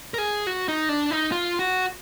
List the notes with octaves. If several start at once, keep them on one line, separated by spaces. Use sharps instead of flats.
A#4
G#4
F#4
D#4
D4
D#4
F4
F#4